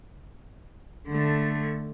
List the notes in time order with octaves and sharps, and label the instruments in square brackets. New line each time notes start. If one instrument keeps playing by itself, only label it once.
[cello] D3 A3